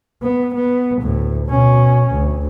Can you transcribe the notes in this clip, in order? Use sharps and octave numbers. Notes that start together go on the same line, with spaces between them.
B3
B3
D2 A2
B2 C#4
D2